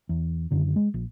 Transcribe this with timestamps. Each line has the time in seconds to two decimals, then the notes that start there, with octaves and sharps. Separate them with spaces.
0.09 E2
0.51 F#1 F#2 D3 D#3
0.76 G#3
0.94 A#1